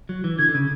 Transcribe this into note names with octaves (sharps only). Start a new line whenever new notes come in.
F#3
E3
D3 G#6
D3
C#3